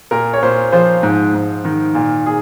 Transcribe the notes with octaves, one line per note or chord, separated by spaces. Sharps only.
A#2 A#4
C#5
A#2 C5
F3 C5
G#2
G#2
D#3
A#2
A#2 G#4